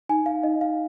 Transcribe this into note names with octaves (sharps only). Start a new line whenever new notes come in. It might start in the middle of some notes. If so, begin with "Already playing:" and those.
D#4 G#5
F5
D#4 D#5
F5